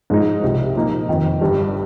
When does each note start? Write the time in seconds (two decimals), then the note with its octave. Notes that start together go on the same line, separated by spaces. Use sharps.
0.10 G#2 F3 G#3 D#4
0.42 C2 C3 F3
0.75 A#2 F3 A#3 D#4
1.09 F1 F2 D#3
1.41 G1 G2 G3